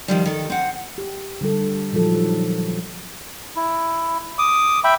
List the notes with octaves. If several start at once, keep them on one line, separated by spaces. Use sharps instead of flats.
D#3 F3 G3
D#3 A4
C4 F#5
G4
D3 G3 A4
A#2 D#3 F3 F#3 A4
E4
D6 D#6
E5 G5 B5